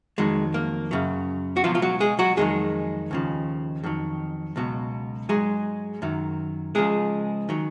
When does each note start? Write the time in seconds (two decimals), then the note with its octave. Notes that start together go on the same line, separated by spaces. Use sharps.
0.18 F2 D#3 F#3 G#3
0.54 A#3
0.91 F#2 C#3 F#3
1.57 F#4
1.64 C#2 B2 F3 F#3 F4
1.75 F4
1.82 F#3 F#4
2.00 G#3 G#4
2.19 F#3 F#4
2.37 F2 D#3 F#3 G#3 G#4
3.11 D#2 C#3 F3
3.83 F2 D#3 F#3
4.56 C#2 B2 F#3
5.29 G#2 F#3 G#3 G#4
6.02 F#2 D#3 F#3
6.75 C#2 C#3 F3 G#3 G#4
7.49 D#3 F#3